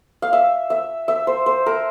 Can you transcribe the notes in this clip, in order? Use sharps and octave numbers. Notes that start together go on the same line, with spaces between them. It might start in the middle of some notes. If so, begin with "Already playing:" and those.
F5
E5
E5
E5
C5
C5
A#4